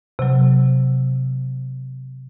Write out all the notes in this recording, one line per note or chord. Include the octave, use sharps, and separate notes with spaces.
C3 F#3